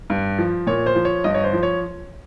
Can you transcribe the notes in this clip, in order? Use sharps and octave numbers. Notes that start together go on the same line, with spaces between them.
G2
F3
A#2 C#5
C5
F3
C#5
G2 D#5
C#5
C5
F3
C#5